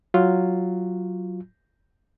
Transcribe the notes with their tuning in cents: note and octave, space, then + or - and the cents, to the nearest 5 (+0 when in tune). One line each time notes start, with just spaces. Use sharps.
F#3 +0 F4 +0